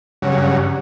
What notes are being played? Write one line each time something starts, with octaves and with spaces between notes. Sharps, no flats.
G2 C#3 F#3